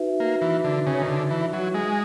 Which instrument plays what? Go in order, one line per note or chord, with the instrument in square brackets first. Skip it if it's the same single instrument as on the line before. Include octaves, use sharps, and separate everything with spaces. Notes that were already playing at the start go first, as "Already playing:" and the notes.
Already playing: [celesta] D#4 F#4 B4 E5
[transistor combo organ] A#3
E3
D3
C#3
D#3
D3
E3
F#3
G#3